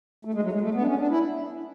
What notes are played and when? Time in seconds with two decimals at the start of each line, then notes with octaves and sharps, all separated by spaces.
0.25 A3
0.34 G#3
0.43 F#3
0.52 G#3
0.61 A3
0.74 B3
0.81 D4
0.86 C#4
0.99 D4
1.10 E4